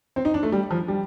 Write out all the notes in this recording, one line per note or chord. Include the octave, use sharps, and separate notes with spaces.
C4
D#4
D4
A3
G3
F3
G3